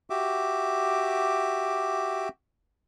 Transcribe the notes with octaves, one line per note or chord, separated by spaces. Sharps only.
F#4 G4 E5 D6